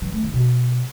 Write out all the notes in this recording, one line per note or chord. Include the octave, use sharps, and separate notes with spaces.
E3
A3
D#3
B2